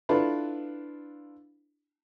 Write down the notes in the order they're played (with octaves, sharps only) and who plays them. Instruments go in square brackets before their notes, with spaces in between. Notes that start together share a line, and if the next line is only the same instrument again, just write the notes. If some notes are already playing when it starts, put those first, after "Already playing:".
[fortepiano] D4 E4 F4 A4 B4